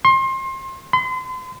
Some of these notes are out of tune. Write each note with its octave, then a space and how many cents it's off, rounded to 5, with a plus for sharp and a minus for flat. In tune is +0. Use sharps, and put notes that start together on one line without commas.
C6 +30
C6 -40